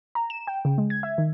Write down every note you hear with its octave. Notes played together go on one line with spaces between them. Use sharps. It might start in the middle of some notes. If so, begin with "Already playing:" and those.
A#5
E7
G5
C#3
G#3
G#6
E5
D#3